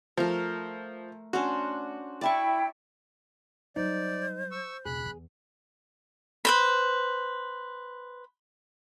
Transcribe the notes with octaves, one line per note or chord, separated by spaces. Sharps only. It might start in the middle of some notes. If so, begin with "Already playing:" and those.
F3 A3 A#4
C#4 D4 F#4 C5
E4 D5 G5 A5 C#6
F#3 G3 D#4 C5 D5
C#6 E6
E1 C#2 G#4 B5 F#6
E2
B4 C5 B5